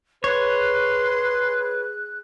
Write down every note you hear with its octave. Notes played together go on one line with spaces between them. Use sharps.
G#4 B4 C#5 C6 F#6